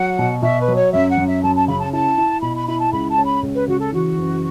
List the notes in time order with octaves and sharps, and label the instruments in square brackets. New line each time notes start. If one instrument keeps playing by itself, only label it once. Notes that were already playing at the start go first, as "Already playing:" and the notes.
Already playing: [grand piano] F#3 [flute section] F#5
[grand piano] B2
[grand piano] B2 [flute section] E5
[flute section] B4
[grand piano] F#3
[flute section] C#5
[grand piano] F#2 [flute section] E5
[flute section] F#5
[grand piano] F#2
[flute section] E5
[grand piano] F#2 [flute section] A5
[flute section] A5
[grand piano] C#3 [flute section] B5
[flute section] A5
[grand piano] E4 [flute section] A5
[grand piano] E4
[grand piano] B2 [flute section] B5
[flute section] B5
[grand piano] E4 [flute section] B5
[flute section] A5
[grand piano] C#2 [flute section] B5
[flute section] A5
[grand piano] C#4
[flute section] B5
[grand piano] C#2
[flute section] B4
[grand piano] C#3 [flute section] F#4
[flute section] A4
[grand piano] E3 [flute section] F#4
[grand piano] F#1